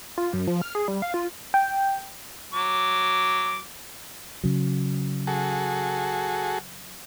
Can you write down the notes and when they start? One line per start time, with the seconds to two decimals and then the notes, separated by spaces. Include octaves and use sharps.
0.18 F4
0.33 F#2
0.47 F3
0.62 F6
0.75 G#4
0.88 G3
1.02 F5
1.14 F4
1.54 G5
2.54 F#3 D6
4.44 C#3 F#3
5.27 F#4 G#4 A4